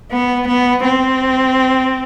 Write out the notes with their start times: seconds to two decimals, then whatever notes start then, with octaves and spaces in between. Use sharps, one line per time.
0.11 B3
0.48 B3
0.85 C4